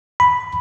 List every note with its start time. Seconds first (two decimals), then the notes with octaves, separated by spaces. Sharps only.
0.20 B5